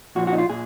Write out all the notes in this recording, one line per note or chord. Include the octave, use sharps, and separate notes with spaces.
A#2 F3 F#4
F#4
D#4
F4
A#2 G#4